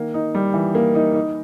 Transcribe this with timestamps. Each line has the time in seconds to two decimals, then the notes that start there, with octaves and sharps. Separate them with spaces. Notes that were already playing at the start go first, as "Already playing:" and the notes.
Already playing: D#3 A#3
0.14 D#4
0.34 G3
0.54 E3
0.75 A#3
0.95 D#4
1.14 D#4